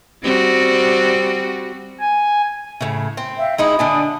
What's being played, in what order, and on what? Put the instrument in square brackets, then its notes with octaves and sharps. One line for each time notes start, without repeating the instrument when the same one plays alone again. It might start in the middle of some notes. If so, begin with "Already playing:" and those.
[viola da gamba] G3 C4 F#4
[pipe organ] G#5
[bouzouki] A2 C#3
C4
[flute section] E5 F5 G5
[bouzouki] G#3 D#4 E4 [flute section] B5 D#6
[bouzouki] D3 D4 G#5